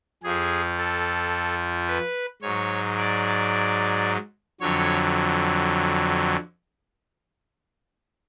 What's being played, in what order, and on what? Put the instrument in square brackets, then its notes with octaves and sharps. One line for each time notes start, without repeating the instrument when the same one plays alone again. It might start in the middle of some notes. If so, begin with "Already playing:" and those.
[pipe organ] F2 F3 G#4
A4
B4
G#2 F#3 C#5
D5
F2 D3 F#3 C#5